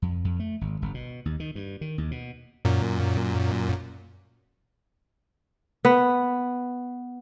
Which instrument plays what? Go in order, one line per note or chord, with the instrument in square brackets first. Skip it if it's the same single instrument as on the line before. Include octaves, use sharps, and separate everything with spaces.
[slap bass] F2
F2
A3
G#1
G1
B2
D#2
D#3
G2
D#3
D#2
B2
[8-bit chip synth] F#2 A#2
[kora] B3